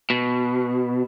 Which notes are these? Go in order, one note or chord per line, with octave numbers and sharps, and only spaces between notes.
B2